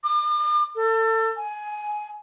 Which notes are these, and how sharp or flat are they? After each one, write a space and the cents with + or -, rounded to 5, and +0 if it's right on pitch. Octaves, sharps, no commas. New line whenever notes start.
D6 +45
A4 +30
G#5 +15